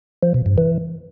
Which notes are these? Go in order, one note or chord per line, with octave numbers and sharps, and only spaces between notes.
F3
B2
G2
E3